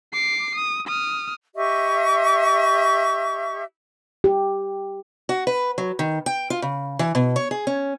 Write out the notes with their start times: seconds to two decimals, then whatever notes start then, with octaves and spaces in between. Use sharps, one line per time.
0.13 D6 C7
0.55 D#6
0.87 D#6 F6
1.56 G4 D#5 E5 C#6
4.24 G4
5.29 F#4
5.47 B4
5.78 F#3
5.99 D#3
6.26 G5
6.50 F4
6.62 C#3
6.99 E3
7.15 B2
7.36 C#5
7.51 G#4
7.67 C#4